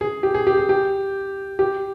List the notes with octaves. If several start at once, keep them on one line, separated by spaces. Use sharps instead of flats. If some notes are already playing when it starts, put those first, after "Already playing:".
G#4
G4
G#4
G4
G#4
G4
G4